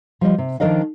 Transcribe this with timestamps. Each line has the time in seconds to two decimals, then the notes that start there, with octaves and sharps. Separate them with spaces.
0.21 F3 G3 D#5
0.38 C3
0.60 D#3 F3 D4 A#4 D#5 F5